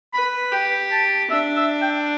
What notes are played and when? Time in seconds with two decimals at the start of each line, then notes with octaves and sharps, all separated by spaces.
0.14 B4 B5
0.52 G4 G5
0.92 A5
1.30 D4 E5
1.57 E5
1.82 G5